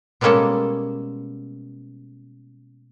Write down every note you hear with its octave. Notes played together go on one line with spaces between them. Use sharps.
B2 G3 G#3 A#3 C#4 A4